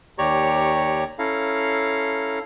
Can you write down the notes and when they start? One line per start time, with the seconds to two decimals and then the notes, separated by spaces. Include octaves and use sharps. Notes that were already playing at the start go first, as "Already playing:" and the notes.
0.18 D#2 G4 C#5 D5 A#5 C#6
1.19 C#4 E4 A4 F5 A#5